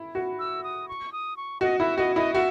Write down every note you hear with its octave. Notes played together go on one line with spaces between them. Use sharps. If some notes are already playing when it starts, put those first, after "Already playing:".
Already playing: E4
F#4
E6
D#6
C#6
D#6
C#6
F#4 D#5
E4 E5
F#4 D#5
E4 D#5
F#4 E5